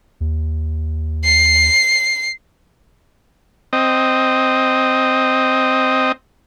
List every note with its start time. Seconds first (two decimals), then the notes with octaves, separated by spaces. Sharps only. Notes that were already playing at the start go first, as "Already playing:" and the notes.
0.20 D#2
1.24 C7
3.73 C4 D#5